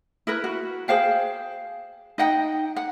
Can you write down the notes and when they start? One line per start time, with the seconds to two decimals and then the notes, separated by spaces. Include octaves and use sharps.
0.27 E4 A#4 B4
0.44 F#4
0.88 G#4 C5 F5 G5
2.18 D#4 D#5 F#5 G5
2.76 F#5